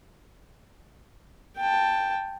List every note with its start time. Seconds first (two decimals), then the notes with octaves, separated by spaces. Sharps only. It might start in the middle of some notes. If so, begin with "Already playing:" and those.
1.57 G5 A5